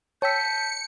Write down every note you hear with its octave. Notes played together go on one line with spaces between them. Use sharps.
C#5 G5 A5 E6 G6 B6 C#7